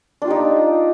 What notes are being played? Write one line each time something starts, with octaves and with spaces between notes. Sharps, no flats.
D4 D#4 F4 G4